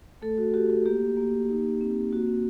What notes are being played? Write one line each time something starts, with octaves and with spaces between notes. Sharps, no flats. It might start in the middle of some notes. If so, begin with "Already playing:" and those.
A3 A4
F#4
F#4 G4
F#4
A#3 G4
A#3
D#4
C4
A#3 F#4